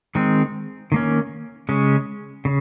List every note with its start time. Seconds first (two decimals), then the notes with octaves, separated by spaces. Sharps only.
0.15 D#3 G#3 C4
0.92 D#3 A#3 C#4
1.69 C#3 G#3 C#4
2.45 C#3